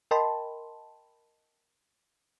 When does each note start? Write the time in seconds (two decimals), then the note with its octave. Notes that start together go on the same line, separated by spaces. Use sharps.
0.11 A#4 D#5 G5 A5 B5 C6